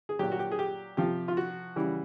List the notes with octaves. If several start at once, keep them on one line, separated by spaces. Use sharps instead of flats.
G#4
A#2 F#3 G4
F#4
G4
G#4
G4
C3 F3 G4
F4
F#4
C#3 E3 G3